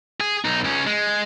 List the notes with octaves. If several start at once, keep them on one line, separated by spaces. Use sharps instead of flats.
G#4
B1 D#4
C#2 C#4
G#3